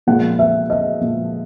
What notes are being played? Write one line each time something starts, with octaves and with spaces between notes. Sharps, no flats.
A#2 F3 G#3 F#5
E5
D#5
A#2 F3 G#3